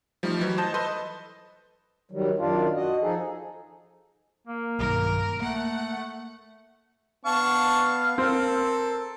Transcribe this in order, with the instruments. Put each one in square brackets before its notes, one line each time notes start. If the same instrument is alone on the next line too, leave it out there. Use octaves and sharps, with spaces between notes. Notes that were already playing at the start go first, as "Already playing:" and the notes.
[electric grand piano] F3 G3 A3 D#4
E3 F#3
C5 D#5 A5 G6
A4 B4 D#5 C6
[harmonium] D#3 F#3 G3
F#2 D#3 D4 F4
F#4 D#5
F3 D#4 G#4 A4
[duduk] A#3
[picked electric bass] B1 G2 D#3 [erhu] A#4
[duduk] A3 [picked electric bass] A#3 [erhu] F#5
[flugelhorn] B3 [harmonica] D4 A5 C#6 [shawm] F5
[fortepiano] C4 [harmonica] A4 [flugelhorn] A#4